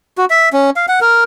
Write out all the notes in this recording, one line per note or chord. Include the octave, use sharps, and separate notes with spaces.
F#4
E5
C#4
F5
F#5
A#4